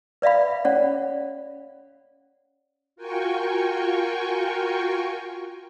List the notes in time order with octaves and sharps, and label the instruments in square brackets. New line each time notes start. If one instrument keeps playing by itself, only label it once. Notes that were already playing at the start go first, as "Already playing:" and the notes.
[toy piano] B4 D5 E5 F5 B5
C#4 C#5 D5 F#5
[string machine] F4 F#4 A#4 G5 G#5 C#6